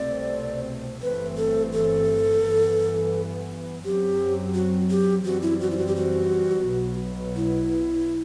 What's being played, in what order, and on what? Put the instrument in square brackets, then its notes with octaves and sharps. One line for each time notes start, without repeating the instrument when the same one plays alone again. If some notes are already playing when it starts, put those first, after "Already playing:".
Already playing: [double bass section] C2 B2 A3 C4 [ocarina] D5
[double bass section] G1 G2 E3 A3 C4 [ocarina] B4
[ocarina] A4
A4
[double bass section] G2 E3 B3
[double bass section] F#2 F#3 C4 [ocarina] G4
[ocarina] F#4
G4
[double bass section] F#2 E3 G3 C4 [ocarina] F#4
[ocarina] E4
F#4
E4
F#4
G4
F#4
[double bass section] B1 B2 F#3 B3
[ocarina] E4